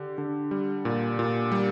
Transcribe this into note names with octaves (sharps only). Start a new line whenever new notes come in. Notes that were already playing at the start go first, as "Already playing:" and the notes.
Already playing: D3 G4
D3
G3
A#2
A#2
G3